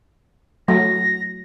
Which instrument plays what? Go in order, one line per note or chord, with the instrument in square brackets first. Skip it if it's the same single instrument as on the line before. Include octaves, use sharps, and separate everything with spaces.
[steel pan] F#3 A3 [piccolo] A#6